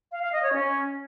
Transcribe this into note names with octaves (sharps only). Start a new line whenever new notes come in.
F5
F5
D#5
C#5
C#4